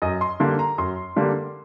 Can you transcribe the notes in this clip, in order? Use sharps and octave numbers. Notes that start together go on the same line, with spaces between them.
F#2 D#5
C6
D3 G3 A#3 C6
A#5
F#2 C6
D3 G3 A#3